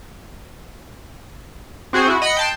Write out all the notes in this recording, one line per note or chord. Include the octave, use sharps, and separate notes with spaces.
C4 F#4 G#4 C5
E4 F#4
D#5 F#5 B5 C#7
G5 A5 C6